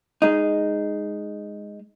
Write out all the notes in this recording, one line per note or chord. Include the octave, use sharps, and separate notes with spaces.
G#3 D#4